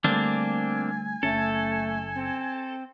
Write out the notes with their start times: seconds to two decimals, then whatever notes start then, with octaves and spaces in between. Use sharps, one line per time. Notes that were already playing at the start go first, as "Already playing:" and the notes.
0.04 D3 G3 A3 A#3 C4 D4 G#5
1.23 F#1 A3 C#4 A4
2.15 C4